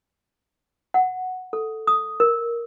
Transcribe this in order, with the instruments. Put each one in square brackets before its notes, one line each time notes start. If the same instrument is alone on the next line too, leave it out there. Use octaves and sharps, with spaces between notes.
[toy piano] F#5
A4
D#6
A#4